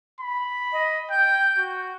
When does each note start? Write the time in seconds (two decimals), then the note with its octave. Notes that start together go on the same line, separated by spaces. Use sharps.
0.20 B5
0.72 D#5
1.10 G5 G6
1.58 F#4